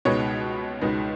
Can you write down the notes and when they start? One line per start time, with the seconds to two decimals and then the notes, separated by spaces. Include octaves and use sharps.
0.05 C#2 B2 G#3 B3 D#4 C#5
0.81 C#2 B2 G#3 B3 D#4